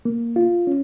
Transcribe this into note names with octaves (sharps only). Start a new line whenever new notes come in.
A#3
F4
C#4